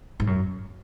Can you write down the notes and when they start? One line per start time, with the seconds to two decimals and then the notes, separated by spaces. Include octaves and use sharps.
0.20 G#2
0.27 F#2